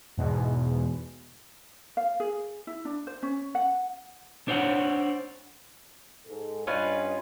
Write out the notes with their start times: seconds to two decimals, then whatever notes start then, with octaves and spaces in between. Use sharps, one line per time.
0.17 E2 G#2 B2
1.97 F5
2.20 G#4
2.67 E4
2.85 D4
3.07 C5
3.23 C#4
3.55 F#5
4.48 D4 C5 C#5 F#5
6.26 G#2 A4
6.67 G2 C#4 F4 B4 D#5